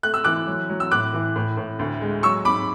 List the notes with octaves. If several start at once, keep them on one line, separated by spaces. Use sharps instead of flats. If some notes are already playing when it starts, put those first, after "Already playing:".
A3 F#6
E6
E3 D6 F#6
F#3
F#3
E6
A2 D6 F#6
E3
A2
A2
D2
G#3
F#3 C#6 E6
G#2 B5 D6